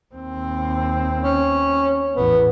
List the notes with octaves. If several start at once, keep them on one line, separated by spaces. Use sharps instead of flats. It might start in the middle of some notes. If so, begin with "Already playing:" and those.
D#2 C4
C#4
A1 E2 B3